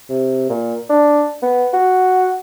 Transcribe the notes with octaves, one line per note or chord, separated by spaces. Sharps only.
C3
A#2
D4
B3
F#4